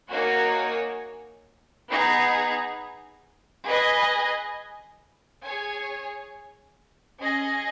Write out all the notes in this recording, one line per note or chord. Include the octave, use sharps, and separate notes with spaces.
A#3 D#4 F#4 C#5 G#5
B3 D#4 G#4
G#4 B4 D#5 G#5
G#4 C#5 G#5
C#4 G#4 D#5 G#5